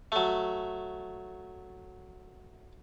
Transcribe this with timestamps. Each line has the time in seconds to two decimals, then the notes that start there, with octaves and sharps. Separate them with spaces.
0.12 F#3 A3